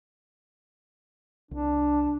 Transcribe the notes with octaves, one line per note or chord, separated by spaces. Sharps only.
C2 D4